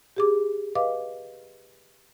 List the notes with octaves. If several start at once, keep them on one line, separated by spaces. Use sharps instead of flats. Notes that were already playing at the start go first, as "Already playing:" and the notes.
G4 G#4 D6
B4 D#5 F5 D6